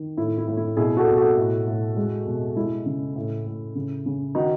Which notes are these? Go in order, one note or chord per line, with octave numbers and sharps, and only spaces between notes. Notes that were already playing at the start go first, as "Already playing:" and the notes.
Already playing: D#3
A2 E4
E4
A2
E4
B2 E4 G#4
F#4 A4
B2
F#4 A4
A2
A2
G#3
B2
G#3 E4
C#3
A2
A2
C#3
C#3
D#3 D#4 F#4